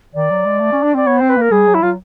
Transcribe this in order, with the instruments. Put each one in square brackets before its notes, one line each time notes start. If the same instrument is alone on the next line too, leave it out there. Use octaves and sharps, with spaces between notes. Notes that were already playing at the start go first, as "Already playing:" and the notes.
[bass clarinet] D#3 [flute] D5
[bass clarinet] F#3
G#3
A3
C#4
D4
[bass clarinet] C4 [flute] D5
[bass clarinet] B3 [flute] C#5
[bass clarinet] C4 [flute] C5
[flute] B4
[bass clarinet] A#3 [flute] A#4
[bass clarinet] G3 [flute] G#4
[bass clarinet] F#3
[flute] E4
[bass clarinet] F#3 [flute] F4